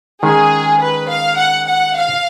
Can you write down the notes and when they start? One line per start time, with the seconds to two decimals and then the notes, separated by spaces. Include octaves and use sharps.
0.22 D#3 G#3 C#4 G#4
0.81 B4
1.09 F5
1.38 F#5
1.67 F#5
1.97 F5